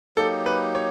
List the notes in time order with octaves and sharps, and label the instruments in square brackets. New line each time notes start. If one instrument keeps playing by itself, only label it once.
[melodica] F#3 A#3 D#4 G4 [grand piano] A4
[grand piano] B4
C#5